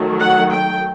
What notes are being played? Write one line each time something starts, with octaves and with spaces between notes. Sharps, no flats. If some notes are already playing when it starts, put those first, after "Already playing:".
Already playing: D#3 F#3 A3
F#5
G5